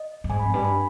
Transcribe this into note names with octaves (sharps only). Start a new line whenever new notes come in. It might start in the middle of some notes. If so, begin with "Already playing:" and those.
Already playing: D#5
G2
G#2 G#5
B5
F2
G2 G#5
B5